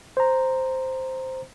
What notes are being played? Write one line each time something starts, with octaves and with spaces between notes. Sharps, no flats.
C5 A#5